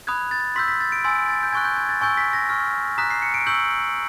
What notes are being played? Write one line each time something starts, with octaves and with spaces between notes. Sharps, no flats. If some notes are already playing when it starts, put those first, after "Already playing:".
B5 D#6 F#6 G#6
A6
C6 E6 G6 B6
B6
A6
D7
G#5 C6 E6 A6
A6
G6
G#5 C#6 F#6 G#6
G6
G#6
A6
G#5 C#6 E6 G6 A6
B6
A#6
C#6 F6
A#5 D#6 F#6 B6
C7
C#7
D7
C#6 E6 G6 F#7